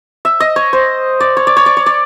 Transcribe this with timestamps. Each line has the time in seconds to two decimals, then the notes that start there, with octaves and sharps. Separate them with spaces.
0.25 E5
0.40 D#5
0.56 C#5
0.73 C5
1.20 D5
1.37 C#5
1.47 D5
1.57 C#5
1.66 D5
1.77 C#5
1.86 D5